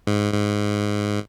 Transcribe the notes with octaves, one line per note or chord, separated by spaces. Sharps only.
G#2
G#2